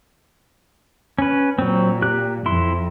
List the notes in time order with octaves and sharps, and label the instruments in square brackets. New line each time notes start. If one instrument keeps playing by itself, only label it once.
[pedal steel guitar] C#4 B4
[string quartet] A#2 [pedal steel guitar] F#3 C4
[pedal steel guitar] G4 F#6
[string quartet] F2 [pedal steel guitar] E4 C6